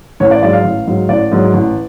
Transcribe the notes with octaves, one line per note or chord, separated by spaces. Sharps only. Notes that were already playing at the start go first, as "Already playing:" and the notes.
A1 C#5
D5
G#2 F#3 D5
F5
A1
G#2 F#3
A1 D5
G#2 F#3
A1